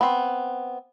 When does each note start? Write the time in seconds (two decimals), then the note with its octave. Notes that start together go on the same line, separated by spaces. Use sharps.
0.01 B3 C4